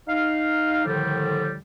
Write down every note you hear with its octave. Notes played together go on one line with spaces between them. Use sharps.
D#4 F5
A2 D3 D#3 F3 G3